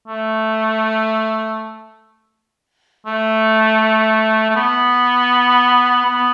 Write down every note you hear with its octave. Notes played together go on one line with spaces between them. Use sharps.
A3
A3
A3
B3
B3